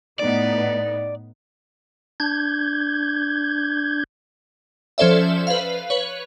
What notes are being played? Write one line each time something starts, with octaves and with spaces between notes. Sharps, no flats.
A2 B3 D#4 D5
D4 G6 G#6
F3 C#4 A4 C5 D5 E5
B4 F5
B4 C#5